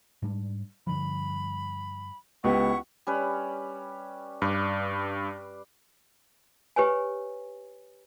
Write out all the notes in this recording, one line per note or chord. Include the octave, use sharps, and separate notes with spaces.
G#2 G3 D4
G2 D3 F3 B5
C#2 B3 E4 G4 F#5 C#6
G3 C#4 B4
G2 B4 D5 F5
G4 B4 C#5 G#5